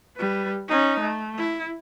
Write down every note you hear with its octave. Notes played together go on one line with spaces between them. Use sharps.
G3 B4
C#4 D#4
A3
E4